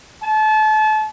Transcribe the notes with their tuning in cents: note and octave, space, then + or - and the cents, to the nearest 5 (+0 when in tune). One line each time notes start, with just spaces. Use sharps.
A5 -30